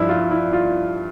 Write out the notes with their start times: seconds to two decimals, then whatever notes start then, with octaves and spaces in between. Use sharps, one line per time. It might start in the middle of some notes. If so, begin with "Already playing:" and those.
Already playing: G2 F3 E4
0.09 F4
0.31 E4
0.53 F4